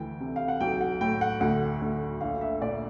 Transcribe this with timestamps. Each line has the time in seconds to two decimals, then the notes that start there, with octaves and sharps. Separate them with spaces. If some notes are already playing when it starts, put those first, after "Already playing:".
Already playing: D2 E3 G5
0.20 C3
0.36 F5
0.48 F#5
0.61 B1 G5
0.81 F#5
1.01 A2 G5
1.21 F#5
1.41 D2 F#5
1.81 D2
2.21 A#1 F5
2.41 E5
2.62 A#2 D5